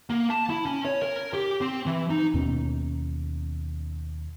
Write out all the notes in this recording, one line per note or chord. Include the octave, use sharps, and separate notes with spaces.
A#3
A5
E4
C#4
C#5
A#4
G4
C4
E3
D#4
D#2 B2 B3 C#4